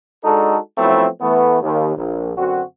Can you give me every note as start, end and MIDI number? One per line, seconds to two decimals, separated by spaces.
0.23 0.56 56
0.23 0.56 62
0.23 0.56 63
0.23 0.56 66
0.23 0.56 69
0.78 1.07 53
0.78 1.07 54
0.78 1.07 57
0.78 1.07 59
0.78 1.07 60
0.78 1.07 64
1.21 1.60 52
1.21 1.60 57
1.21 1.60 59
1.61 1.92 39
1.96 2.31 34
2.36 2.61 42
2.36 2.61 50
2.36 2.61 60
2.36 2.61 66